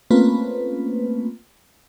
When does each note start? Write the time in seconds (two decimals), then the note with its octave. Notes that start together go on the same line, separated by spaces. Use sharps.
0.11 A3 A#3 C4 C#4 F4 B4